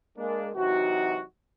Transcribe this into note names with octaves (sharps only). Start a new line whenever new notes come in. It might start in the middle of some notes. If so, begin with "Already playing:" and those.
G#3 A#3 D4
C3 E3 F#3 D#4 F#4